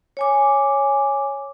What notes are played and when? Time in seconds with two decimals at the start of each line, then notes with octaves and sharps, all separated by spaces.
0.17 C#5 G#5 D6